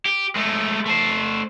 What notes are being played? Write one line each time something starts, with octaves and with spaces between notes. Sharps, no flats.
G4
G#3 A3
A3 C5